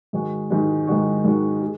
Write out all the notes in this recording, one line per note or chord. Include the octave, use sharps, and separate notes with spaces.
G#2 D#3 G#3 F#4
G#2 D#3 G#3 F#4
G#2 D#3 G#3 F#4
G#2 D#3 G#3 F#4
G#4